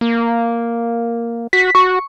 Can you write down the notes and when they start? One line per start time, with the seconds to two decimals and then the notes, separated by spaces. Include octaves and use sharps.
0.01 A#3
1.53 F#4 B6
1.75 F#4 C#6